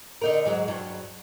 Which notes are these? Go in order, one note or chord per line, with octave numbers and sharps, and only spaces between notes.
D3 D#4 A#4
G#2 F#3 G#3
G2 F#3